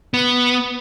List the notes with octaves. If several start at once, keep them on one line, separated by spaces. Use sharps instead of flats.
B3